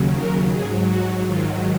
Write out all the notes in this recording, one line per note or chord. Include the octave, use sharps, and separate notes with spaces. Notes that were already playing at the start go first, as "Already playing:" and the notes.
Already playing: D#2 C#3 F#3
A#4
G#2 F#3 G#4
F#4
G#2 D#3 F#3 F4